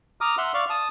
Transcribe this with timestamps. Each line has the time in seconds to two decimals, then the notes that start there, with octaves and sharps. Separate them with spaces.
0.21 A#5 D6 D#6 F6
0.38 E5 F#5 C6
0.54 D5 F5 C#6
0.70 A5 D#6